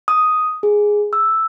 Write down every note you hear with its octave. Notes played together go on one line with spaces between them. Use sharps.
D#6
G#4
E6